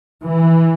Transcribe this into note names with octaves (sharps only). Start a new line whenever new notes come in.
E3